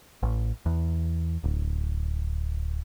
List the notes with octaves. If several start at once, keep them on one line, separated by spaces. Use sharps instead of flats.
A1
E2
D1